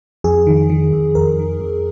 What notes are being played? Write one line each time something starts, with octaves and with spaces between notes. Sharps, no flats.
F2 G#4
D#3
D#3
F2
F2 A#4
D#3
F2